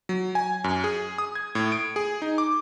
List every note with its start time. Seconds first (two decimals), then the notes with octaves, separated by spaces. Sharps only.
0.09 F#3
0.35 G#5
0.64 F#2
0.84 G#4
1.18 D#6
1.35 G#6
1.55 A2
1.72 D7
1.96 G#4
2.22 D#4
2.38 D6